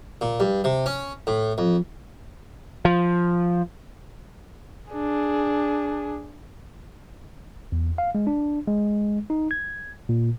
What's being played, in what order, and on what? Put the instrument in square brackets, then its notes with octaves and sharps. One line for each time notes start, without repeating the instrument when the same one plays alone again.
[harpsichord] A#2
G2
C3
C#4
A2
F2
[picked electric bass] F3
[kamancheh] D4 G#4
[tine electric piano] E2
F5
G#3
D4
G#3
D#4
G#6
A#2